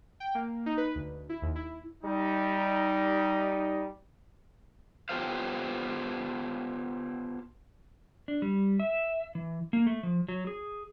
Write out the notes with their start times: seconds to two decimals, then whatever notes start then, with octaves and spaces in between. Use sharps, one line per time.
0.20 G5
0.35 A#3
0.66 D#4
0.77 B4
0.95 D2
1.29 E4
1.42 D#2
1.56 E4
2.03 G3 D#4
5.09 B3 F4 G4 A4 C5 F5
8.28 D4
8.42 G3
8.80 E5
9.35 E3
9.73 A#3
9.87 A3
10.03 F3
10.28 F#3
10.47 G#4